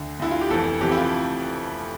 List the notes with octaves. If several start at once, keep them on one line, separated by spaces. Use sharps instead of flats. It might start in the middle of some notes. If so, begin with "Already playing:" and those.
Already playing: D2 D3
D2 D3 E4
F4
G4
F1 F2 E3 A4
F1 F2 E3 G4
E4
F4